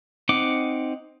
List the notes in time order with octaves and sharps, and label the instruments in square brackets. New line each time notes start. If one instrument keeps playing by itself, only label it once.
[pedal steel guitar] C4 D#4 F#5 D6